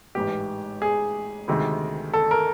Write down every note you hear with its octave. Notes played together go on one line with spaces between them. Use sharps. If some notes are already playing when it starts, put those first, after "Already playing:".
A1 G#2 E3 G4
G#4
D2 C3 D#3 G#3
A4
A#4